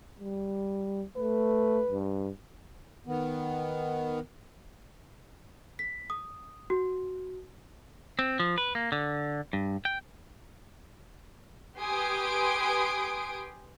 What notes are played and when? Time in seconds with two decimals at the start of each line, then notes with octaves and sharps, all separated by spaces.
0.19 G3
1.17 A3 B4
1.91 G2
3.07 D#3 B3
5.79 B6
6.10 D#6
6.70 F#4
8.19 C4
8.40 F3
8.58 B4
8.75 A#3
8.92 D3
9.53 G2
9.85 G5
11.79 G4 B4 G#5 C6 D#6 D7